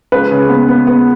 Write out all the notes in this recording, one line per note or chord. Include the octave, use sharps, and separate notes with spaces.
C#2 B4
C#3
B3
B3
B3